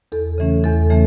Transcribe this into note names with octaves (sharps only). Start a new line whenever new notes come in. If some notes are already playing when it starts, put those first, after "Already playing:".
E2 A4
C#3 E3 A3 C#4
E2 A4
C#3 E3 A3 C#4